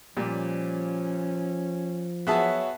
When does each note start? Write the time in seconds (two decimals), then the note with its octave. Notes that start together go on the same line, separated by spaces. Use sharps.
0.17 A#2 F3 G3 C#4
2.27 F#3 B3 F#4 G#4 E5 A5